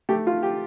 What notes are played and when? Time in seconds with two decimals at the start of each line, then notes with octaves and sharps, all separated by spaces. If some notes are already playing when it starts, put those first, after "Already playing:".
0.09 A3 G4
0.27 F4
0.43 G4